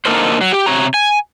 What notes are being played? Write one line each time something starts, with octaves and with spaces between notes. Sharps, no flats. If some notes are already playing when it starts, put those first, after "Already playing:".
D3 A#3 D#4 A4 A#4 C5
F#3
G4
C3 C#5 A#5
G#5